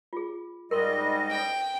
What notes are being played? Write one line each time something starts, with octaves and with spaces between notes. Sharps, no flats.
F4 G#4
G#2 G3 A#4 D#5 C6
G5